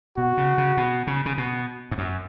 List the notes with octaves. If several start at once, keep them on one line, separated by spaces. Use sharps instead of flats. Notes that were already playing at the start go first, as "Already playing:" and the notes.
B2 F#4
C#3
C#3
B2
C#3
C#3
B2
G#2
F#2